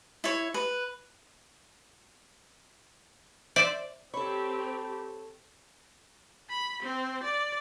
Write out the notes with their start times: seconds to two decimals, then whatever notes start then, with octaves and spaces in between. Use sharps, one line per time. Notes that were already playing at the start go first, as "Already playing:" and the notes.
0.24 E4 C#5
0.54 B4
3.56 C5 D5 E5
4.14 C4 G4 A4 C#5 B5 C#6
6.50 B5
6.82 C4
7.23 D5